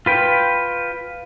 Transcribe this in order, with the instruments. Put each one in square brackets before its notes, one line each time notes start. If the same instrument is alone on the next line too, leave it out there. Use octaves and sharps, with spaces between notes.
[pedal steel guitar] F4 B4 G5